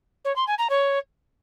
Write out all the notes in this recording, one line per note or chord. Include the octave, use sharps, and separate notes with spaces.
C#5
C6
G#5
A#5
C#5